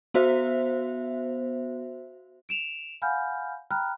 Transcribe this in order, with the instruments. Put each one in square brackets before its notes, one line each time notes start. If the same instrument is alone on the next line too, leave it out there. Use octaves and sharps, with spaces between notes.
[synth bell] B3 F#4 C5 E5
[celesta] D7 E7 F7
F5 F#5 G#5 B5 F6 G6
G5 A#5 B5 F6 F#6